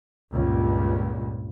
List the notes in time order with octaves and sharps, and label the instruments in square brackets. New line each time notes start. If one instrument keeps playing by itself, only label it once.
[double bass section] C#2 G2 A#2